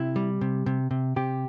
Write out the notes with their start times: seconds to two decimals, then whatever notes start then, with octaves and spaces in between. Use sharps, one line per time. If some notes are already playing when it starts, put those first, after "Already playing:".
Already playing: C3 E4
0.16 G3
0.41 C3
0.66 C3
0.91 C3
1.16 C3 G4